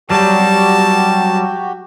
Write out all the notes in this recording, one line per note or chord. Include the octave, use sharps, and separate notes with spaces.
F#3 G3 F#4 G4 A5